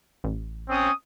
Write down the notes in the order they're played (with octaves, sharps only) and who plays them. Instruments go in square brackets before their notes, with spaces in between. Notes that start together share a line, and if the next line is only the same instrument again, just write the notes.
[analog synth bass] A1
[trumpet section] C4 C#4 D#6